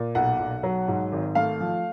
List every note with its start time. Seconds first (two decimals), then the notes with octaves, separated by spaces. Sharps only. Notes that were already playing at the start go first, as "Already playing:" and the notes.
Already playing: A#2
0.15 B1 F#5
0.39 B1
0.63 F#3
0.88 G#2
1.12 G#1
1.35 A3 F5
1.61 F3